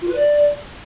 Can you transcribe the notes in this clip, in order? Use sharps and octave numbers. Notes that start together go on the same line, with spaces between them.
F4
B4
D5